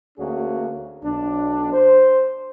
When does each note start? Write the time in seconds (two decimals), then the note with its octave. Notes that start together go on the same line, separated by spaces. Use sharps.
0.19 D2 A#3 C#4 F#4 G#4
1.04 B1 D4
1.73 C5